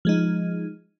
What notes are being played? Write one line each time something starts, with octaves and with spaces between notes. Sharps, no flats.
F3 G#3 D#4